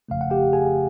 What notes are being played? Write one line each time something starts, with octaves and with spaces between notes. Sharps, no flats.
G1 F2 C#3 F3 A3 F5
F#5
G4 G5
G#4 G#5